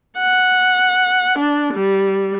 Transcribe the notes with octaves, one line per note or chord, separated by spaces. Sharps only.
F#5
D4
G3